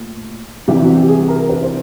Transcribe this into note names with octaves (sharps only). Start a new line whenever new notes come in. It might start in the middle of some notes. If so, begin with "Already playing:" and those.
Already playing: A#2 A3
C2 C3 E3 G3 G4
F#4
G4
G#4
A#4
B4
C5